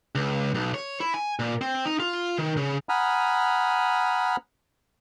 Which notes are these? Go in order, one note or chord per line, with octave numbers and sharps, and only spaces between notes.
C#2
B1
C#5
E4
G#5
A#2
C4
D#4
F4
D#3
C#3
F#5 G#5 A#5 B5 D#6 F6